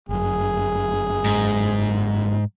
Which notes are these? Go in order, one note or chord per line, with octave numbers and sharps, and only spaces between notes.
G1 F#2 G#4
G#2